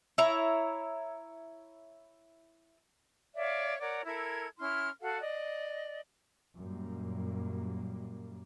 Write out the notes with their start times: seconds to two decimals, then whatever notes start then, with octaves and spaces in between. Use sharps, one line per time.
0.18 E4 C#5 A#5
3.35 C#5 D5 E5 F5
3.80 A#4 C#5 D5 F#5
4.06 E4 A4 A#4 G#6
4.59 C#4 E4 C6 F6
5.01 F#4 A4 F5 F#5
5.20 D5 D#5
6.56 F#2 A#2 G3 A#3